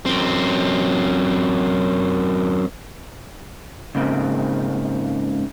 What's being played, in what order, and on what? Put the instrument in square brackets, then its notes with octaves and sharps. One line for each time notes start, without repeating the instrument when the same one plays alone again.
[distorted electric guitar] F#2 C4
[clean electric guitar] C#2 G#2 C#3 A#3 C4